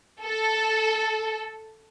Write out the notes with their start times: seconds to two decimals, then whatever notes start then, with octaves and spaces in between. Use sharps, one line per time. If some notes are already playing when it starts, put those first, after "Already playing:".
0.22 A4